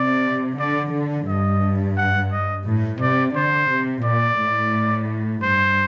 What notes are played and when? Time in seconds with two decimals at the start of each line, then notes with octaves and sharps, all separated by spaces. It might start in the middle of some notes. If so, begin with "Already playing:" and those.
Already playing: C3 D5
0.60 D3 D5
0.94 D3
1.28 G2 D#5
1.97 F#5
2.32 D#5
2.66 A2
3.01 C3 D5
3.36 D3 C5
3.70 C3
4.04 A#2 D5
4.39 A2
5.43 G2 C5